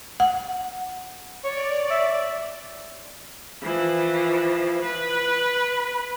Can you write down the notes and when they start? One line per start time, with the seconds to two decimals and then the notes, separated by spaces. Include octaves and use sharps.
0.20 F#5
1.44 C#5 D5
1.90 E5
3.62 E3 F3
4.82 B4